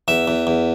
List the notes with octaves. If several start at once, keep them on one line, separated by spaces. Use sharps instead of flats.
E2 E5
E2
E2